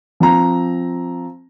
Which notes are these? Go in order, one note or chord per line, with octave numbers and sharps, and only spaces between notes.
F3 C4 A#5